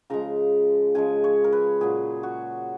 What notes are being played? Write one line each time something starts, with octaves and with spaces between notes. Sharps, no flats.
C#3 F3 G#3 A#5
C#3 F3 G#3 G#5
C#5
A#4
B4
A#2 F#3 G#4
F#4